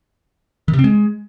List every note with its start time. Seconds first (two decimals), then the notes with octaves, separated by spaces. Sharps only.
0.68 D#3
0.73 C3
0.79 C4
0.84 G#3